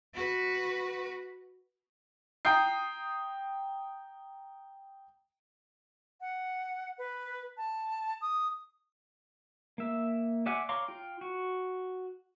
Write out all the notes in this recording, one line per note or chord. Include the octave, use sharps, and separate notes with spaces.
F#4 B4
G5 A#5 D#6 G6 C7
F#5
B4
A5
D#6
A#3 E5
D5 E5 F#5 G#5 D6
C#5 F5 A#5 C6 D6
F4 G5
F#4